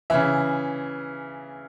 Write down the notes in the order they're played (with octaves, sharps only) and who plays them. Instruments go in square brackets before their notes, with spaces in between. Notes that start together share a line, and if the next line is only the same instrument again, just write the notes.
[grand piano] C#3 E3 E5